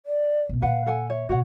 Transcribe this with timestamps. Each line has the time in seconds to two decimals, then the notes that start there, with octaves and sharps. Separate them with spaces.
0.06 D5
0.49 B1 A#2
0.62 A#2 D3 B4 F5 F#5
0.86 A4 F#5 G#5
1.10 C#5 E5
1.29 B2 A#3 F#4 C#5 F#5